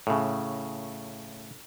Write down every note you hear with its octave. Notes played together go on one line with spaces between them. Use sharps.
A2 C#3